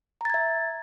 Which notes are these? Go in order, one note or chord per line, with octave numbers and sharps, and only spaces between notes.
E5 A#5 G#6 A6